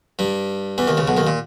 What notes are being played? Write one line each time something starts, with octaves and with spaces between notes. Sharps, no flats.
G2 G3
E2 E3
D#2 D#3
C#2 C#3
B1 B2
D#2 D#3
A#2